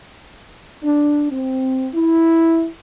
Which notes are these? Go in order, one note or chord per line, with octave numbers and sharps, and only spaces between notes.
D4
C4
E4